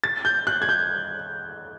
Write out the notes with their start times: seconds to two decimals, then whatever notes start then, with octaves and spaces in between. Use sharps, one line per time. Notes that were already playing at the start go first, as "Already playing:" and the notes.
0.04 A6
0.25 G6
0.47 F#6
0.62 G#6
0.69 G6